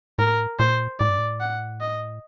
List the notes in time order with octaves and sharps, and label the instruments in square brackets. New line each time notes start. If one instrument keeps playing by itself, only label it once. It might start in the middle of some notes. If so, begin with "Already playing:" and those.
[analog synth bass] A2 [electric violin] A#4
[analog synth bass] A#2 [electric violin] C5
[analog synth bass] A2 [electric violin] D5
[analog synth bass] G2
A2
[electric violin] F#5
D#5